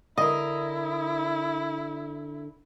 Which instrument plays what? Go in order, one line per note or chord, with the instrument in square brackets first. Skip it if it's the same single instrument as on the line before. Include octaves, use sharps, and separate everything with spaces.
[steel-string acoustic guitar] D3 A#4 [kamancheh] E4 [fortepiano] D#5